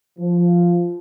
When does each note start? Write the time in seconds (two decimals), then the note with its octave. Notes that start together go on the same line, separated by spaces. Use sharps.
0.19 F3